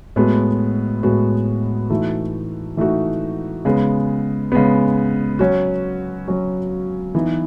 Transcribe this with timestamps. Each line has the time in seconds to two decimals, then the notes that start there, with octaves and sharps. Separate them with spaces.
0.16 A2 G#3 B3 F#4
1.03 A2 G#3 B3 F#4
1.90 E3 A3 D#4 F#4
2.77 E3 A3 D#4 F#4
3.65 C#3 G#3 B3
4.52 C#3 G#3 B3
5.39 F#3 C#4 F#4
6.27 F#3 C#4 F#4
7.15 E3 B3 D#4